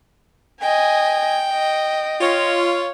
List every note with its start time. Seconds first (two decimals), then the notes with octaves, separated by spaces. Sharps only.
0.61 D#5 G5 G#5
1.52 D#5
2.21 F4 C#5